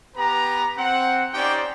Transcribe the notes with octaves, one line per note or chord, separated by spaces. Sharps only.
B3 G4 B4 A#5
C4 F#5
C#4 D#4 G4 C5 D5 G5